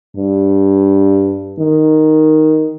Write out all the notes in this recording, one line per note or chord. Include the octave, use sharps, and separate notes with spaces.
G2
D#3